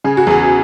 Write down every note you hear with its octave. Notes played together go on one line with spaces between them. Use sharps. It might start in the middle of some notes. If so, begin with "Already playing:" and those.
C#3 G#4
F#4
E2 G#4